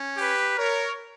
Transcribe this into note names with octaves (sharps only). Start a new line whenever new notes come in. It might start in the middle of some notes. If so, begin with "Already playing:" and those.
Already playing: C#4
G4 B4
A#4 C#5